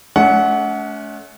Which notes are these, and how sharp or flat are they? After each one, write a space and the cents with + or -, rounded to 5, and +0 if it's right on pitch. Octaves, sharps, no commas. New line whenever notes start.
A3 -35 C#4 +40 F#5 +0